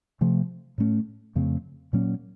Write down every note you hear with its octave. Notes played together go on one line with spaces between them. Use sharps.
C3 F3 A3
A2 A3 C#4
F2 C#3 A3 C4
A#2 F#3 A#3 C#4